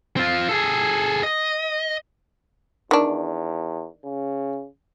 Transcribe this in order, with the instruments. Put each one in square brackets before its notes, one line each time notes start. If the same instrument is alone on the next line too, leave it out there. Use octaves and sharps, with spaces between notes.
[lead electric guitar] C4 F4
G#4 A4
D#5
[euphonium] E2 [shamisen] D#3 D4
[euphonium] C#3